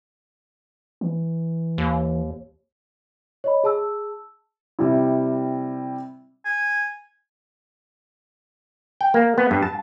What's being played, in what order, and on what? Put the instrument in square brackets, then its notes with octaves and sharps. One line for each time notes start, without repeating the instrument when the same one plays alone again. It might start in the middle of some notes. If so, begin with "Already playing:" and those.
[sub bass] E3
[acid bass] D#2
[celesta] C#5 D#5 B5
G#4 A5 E6
[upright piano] C3 G3 E4
[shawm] G#5
[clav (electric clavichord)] G5
A#3
B3
G2
A5